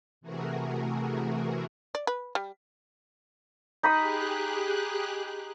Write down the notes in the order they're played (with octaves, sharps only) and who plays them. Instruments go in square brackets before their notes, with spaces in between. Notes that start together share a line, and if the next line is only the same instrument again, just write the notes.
[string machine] C3 E3 A3 F#4 G#4 A#4
[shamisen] D5
B4
G3
[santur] D#4 B5 D#6 [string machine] G4 G#4 F#6